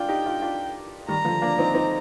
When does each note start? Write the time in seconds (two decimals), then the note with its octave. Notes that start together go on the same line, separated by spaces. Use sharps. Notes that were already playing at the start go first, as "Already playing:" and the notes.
Already playing: D4 F4 G5
0.09 D#4 G4
0.26 D4 F4
0.42 D4 F4
1.08 D#3 G3 A#5
1.25 D3 F3
1.42 A#3 D4
1.58 C4 D#4
1.74 C4 D#4